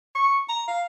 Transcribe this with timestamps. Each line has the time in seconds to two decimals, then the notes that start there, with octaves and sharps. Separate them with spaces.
0.15 C#6
0.49 A#5
0.68 F5